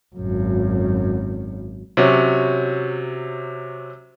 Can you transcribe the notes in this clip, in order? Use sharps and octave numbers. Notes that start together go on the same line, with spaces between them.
G#1 F#2
C3 F#3 C#4